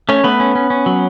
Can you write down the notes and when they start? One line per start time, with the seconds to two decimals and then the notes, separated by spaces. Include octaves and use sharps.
0.09 A3 C#4 C#5
0.24 A3 B3 B4
0.40 C#4
0.55 C#4
0.70 C#4
0.86 F#3